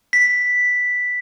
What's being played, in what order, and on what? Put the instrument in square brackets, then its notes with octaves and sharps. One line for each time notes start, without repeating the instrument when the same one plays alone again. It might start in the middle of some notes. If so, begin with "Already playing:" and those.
[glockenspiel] B6